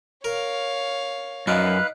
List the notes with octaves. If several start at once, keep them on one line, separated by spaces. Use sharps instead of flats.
A#4 C#5 F5
F#2 D#4 B4 D5 F5 F#6